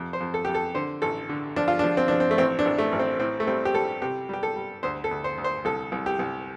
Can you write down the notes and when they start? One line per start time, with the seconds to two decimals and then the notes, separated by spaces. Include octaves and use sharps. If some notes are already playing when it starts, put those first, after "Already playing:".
Already playing: F2 C3
0.13 C5
0.20 F2
0.34 A4
0.45 F2 G4
0.55 A4
0.75 D3 C5
1.02 A1 A4
1.29 D3
1.56 F3 D4
1.68 F4
1.79 D4
1.84 F3
1.97 C4
2.08 F3 D4
2.20 C4
2.31 A3
2.38 A1 C4
2.59 D4
2.65 A1
2.78 A3
2.92 A1
2.99 C4
3.20 A2 C4
3.40 A3
3.47 G3 C4
3.65 G4
3.74 G3 A4
4.02 C3 G4
4.29 G3 G4
4.43 A4
4.56 G3
4.83 D2 C5
5.04 A4
5.11 D2
5.24 C5
5.38 D2
5.44 C5
5.65 C2 A4
5.92 C2
6.06 G4
6.19 C2